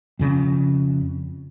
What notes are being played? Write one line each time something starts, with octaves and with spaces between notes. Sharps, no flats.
F2 C#3 C#4